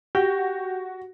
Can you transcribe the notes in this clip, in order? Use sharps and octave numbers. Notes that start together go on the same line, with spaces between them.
F#4 G4